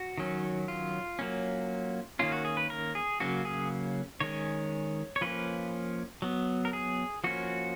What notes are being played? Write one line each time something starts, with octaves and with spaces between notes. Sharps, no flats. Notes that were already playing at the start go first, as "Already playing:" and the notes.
Already playing: F#4
D#3 F#3 C#4
F4
F#3 A#3 C#4
D#3 A#3 C#4 F4
F#4
G#4
B4
A#4
G#4
C#3 F#3 A#3 C#4 F#4
G#4
D#3 G#3 C#4 C#5
C#5
F3 A#3 C#4 B4
F#3 B3
A#4
G#4
F3 A#3 C#4 F#4